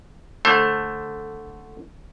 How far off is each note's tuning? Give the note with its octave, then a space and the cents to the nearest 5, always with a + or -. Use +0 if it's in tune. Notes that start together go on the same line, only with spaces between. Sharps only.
D3 +5 A3 +0 C5 +35